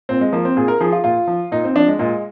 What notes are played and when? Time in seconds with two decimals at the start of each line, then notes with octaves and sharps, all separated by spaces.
0.09 A#2 C4
0.21 G#3
0.33 F3 A#3
0.45 C4
0.57 A#2 G#4
0.68 A#4
0.81 F3 G#4
0.92 F4
1.04 A#2 F4
1.27 F3
1.52 A#2 D#4
1.64 C4
1.75 F3 D4
1.88 G#3
1.99 A#2 G#3